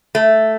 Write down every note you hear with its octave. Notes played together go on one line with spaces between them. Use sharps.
A3